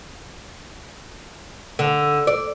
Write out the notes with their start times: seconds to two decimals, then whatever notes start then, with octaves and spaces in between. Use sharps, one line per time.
1.79 D3
2.27 D5